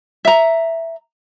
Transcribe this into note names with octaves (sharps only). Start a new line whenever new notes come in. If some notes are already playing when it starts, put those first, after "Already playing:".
E5 A#5